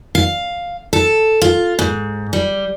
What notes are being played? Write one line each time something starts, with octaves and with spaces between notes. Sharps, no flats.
F5
A4
F4
G#2
G3